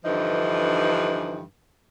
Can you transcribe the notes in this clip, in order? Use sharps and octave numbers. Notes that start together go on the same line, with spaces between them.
G2 D3 E3 F3 D#4